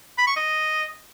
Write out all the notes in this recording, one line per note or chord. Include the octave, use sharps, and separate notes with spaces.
B5
C#6
D#5